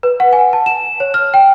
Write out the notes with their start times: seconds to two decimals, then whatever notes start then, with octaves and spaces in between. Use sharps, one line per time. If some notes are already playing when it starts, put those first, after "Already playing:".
0.03 B4
0.20 F#5
0.33 G#5
0.53 A5
0.66 E7
1.00 C#5
1.14 F6
1.34 G5